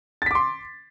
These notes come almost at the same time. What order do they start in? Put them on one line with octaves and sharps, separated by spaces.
A6 B6 D6 C6